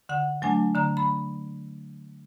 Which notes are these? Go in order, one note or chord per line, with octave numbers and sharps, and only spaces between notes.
D3 F#5
F#3 A3 D4 G#5
D3 A#5
B5